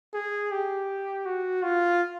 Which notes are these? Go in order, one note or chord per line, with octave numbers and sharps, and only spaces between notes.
G#4
G4
F#4
F4